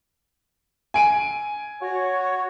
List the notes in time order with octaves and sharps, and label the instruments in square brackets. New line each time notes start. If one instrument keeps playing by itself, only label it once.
[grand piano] G#5 D7 D#7
[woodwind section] F#4 C#5